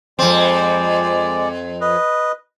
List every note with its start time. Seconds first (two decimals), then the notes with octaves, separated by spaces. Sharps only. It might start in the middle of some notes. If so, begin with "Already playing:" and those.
0.19 F2 G#3 C4 D5
1.81 B4 D#5